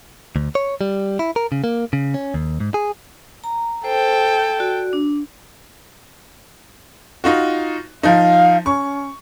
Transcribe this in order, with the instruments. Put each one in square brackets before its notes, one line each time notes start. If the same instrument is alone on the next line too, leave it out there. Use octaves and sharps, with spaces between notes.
[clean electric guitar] D2
C#5
G3
E4
A#4
C#3
A#3
C#3
C#4
D#2
G#2
G#4
[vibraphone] A#5
[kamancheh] A4 G5 [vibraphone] C5
[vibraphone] F#4 D5
D4
[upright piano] D#4 F4 F#4
[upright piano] F3 D#4 [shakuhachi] F5
[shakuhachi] C#4 [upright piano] C#6